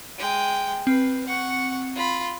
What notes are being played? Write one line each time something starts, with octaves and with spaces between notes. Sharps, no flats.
G#3 G5
C4 B4
F#5 C#6
F4 B5